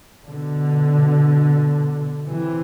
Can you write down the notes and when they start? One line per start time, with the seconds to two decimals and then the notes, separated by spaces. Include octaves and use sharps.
0.25 B2 D3
2.26 C3 E3